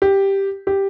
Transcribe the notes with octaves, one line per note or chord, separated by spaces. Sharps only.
G4
G4